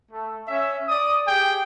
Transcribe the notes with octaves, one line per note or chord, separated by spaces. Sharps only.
A3
C#4 E5
D5 D#6
G4 G#4 G5